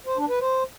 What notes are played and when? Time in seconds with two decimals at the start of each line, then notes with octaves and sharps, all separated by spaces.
0.06 C5
0.18 D4
0.29 B4
0.41 C5